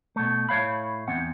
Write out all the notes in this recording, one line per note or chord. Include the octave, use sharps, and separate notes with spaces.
B2 A3
A2 A3 C#5 F5 B5
E2 C4 F#5